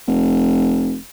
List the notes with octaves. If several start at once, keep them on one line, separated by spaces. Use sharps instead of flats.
F1